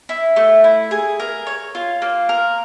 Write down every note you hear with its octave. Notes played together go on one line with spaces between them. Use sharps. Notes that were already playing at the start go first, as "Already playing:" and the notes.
E4
A3
E4
G#4
A#4
C#5
F4
A#3
A#4